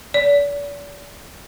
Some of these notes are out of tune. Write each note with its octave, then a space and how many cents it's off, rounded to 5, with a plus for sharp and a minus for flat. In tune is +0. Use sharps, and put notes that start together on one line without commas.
D5 -40